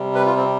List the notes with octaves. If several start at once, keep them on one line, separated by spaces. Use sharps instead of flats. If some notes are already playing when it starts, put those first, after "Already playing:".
Already playing: C3 G3
B4
F4
C4